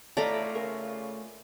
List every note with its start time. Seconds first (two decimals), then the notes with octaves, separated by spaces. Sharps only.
0.17 A2 A3 F4 A4 D5 D#5 A#5 B5
0.55 C#3 A#4